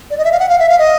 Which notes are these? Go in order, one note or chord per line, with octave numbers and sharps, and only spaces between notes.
D5
D#5
E5
F5
F#5
F5
E5
F5
D#5